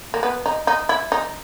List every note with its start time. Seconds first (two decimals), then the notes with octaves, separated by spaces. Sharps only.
0.14 A#3
0.23 B3
0.46 D#4
0.67 D#4
0.89 E4
1.12 D#4